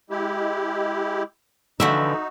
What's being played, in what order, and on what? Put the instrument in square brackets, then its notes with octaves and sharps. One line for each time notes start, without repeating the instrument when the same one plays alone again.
[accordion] G#3 E4 G4
[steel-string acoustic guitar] D3 E3 F3 [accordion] D#4 [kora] F#4 E5